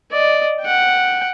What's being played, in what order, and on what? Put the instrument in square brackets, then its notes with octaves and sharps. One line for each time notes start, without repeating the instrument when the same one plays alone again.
[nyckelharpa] D5 D#5
F#5 G5